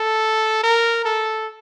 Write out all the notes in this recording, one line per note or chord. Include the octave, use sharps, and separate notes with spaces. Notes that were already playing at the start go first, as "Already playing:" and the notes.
Already playing: A4
A#4
A4